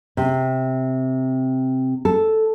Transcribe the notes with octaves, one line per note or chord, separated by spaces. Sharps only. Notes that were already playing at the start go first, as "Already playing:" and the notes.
C3
A4